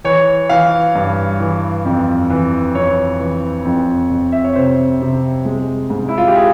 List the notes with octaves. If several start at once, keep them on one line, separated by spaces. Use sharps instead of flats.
E3 C#5
E3 F5
G2
E3
F2
E3
F2 C#5
E3
F2
F2
E5
C#5
C3 C5
C3
G#3
G#2
E4
F4
G4
G#4